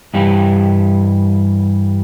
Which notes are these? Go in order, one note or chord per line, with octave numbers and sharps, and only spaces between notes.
G2 E3 G3